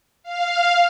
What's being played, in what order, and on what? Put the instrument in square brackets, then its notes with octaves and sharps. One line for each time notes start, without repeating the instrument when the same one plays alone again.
[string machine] F5